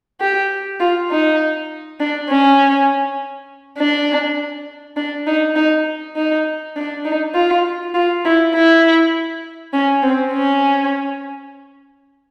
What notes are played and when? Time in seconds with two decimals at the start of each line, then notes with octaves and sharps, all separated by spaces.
0.21 G4
0.80 F4
1.11 D#4
2.00 D4
2.30 C#4
3.79 D4
4.97 D4
5.27 D#4
5.56 D#4
6.16 D#4
6.76 D4
7.05 D#4
7.34 F4
7.94 F4
8.25 E4
8.54 E4
9.73 C#4
10.02 C4
10.33 C#4